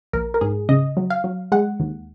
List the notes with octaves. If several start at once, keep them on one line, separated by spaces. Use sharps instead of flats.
A#1 A#4
A#4
G#2 G#4
C#3 D#5
F#3
F5
F#3
G#3 F#5
D#2